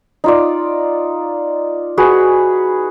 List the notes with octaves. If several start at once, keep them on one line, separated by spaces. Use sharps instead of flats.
D#4 F4 D5
F#4 G#4 B4